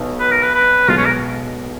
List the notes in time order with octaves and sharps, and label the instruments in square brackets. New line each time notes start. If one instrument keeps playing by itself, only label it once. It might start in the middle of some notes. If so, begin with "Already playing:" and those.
Already playing: [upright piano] B1 B2 B3 D#4
[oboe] B4
A#4
B4
B4
[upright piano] B1 B2 G#3 [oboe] F4
[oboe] C#4
A#4